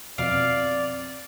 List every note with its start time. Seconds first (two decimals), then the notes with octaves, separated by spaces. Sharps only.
0.18 F2 B2 C4 D5 F5 D7